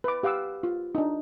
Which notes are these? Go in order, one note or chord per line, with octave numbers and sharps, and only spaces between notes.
B4 D6
G4 F5 F#5 D6 E6
F4
D4 D#4